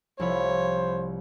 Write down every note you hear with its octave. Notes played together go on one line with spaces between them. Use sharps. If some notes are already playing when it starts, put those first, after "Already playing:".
C2 F3 E4 C5 C#5